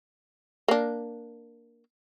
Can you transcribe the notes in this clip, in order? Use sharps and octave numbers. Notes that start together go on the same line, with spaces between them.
A#3 D4